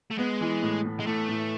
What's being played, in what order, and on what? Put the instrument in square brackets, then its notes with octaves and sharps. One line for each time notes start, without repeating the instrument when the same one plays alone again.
[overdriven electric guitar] A3
[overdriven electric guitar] G#3 [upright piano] B3
[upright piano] E3
A2
A2
[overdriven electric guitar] G#3
[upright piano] A2 [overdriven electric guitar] A3
[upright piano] A2